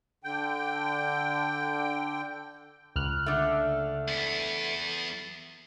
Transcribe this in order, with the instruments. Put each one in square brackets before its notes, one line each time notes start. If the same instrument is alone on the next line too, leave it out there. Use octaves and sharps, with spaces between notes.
[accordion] D3 G5
[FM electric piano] C#2 F6 F#6
[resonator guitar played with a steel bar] D3 A3
[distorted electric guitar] E2 B3 [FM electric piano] A6